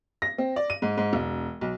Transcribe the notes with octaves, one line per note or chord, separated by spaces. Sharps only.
A#6
C4
D5
D#7
G#2
G#2
E1
B1